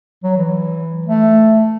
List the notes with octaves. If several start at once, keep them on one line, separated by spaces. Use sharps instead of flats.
F#3
E3
A3